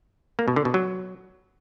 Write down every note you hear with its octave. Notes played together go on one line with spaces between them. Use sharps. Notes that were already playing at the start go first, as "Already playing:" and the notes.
A#3
B2
D3
B2
F#3